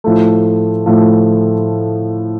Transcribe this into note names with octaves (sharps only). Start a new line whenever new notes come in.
A2 F3 A3
A2 F3 A3